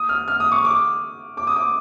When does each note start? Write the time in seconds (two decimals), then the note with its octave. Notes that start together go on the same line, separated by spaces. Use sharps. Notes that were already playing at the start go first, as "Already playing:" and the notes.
Already playing: D#6
0.09 F6
0.28 F6
0.40 D#6
0.52 C#6
0.65 D6
1.37 D6
1.47 D#6
1.56 D6